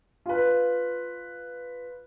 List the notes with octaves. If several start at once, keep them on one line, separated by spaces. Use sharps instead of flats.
F4 B4